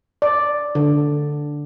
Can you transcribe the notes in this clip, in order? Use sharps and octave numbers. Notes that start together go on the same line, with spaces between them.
D5
D3